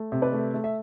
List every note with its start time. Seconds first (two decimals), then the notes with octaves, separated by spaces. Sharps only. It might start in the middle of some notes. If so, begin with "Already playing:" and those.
Already playing: A3
0.12 C3
0.22 B4 D5
0.33 A3
0.54 A3
0.64 E5